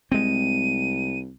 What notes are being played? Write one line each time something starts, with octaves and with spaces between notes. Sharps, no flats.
C2 G#3 C4 D#7